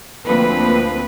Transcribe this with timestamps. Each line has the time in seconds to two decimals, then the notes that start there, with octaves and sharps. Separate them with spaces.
0.26 D2 F3 A#3 C4 B4